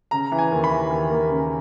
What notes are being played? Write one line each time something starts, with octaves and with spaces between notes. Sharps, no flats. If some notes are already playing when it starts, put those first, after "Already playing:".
C#3 A#5
E3
G#5
D#2
B5
E3
D#2
A#3
C#3